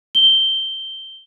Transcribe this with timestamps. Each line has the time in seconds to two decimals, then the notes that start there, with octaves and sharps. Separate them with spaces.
0.15 G7